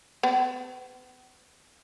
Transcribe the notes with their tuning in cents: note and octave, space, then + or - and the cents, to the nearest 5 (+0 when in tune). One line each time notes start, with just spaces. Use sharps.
B3 +40